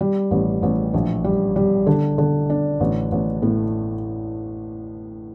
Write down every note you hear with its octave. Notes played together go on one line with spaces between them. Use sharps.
G3
A1
A1
A#1
G3
G3
D3
D3
D4
A1
A1
A2